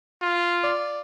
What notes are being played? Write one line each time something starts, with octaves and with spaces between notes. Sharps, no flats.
F4
D5